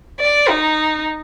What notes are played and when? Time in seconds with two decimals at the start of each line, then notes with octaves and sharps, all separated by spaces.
0.20 D5
0.49 D#4